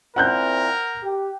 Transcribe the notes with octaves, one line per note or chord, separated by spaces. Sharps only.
A#2 C4 E4 A#4 F#5 F#6 G6
G4